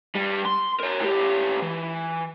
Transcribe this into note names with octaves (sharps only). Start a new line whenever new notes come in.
G2 G3
C6
A#4 C#5
A2 G4
E3